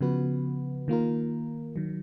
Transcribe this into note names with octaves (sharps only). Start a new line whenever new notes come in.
C#3 F3 B3 F#4 B4
D#3 A#3 F4 A#4
D#3 F#3